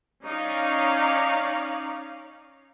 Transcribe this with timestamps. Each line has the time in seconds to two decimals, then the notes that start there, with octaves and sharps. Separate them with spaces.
0.24 C#4 D#4 C#5 D5 F5